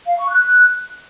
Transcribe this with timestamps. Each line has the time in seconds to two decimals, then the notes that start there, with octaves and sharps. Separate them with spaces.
0.06 F5
0.18 C#6
0.29 F#6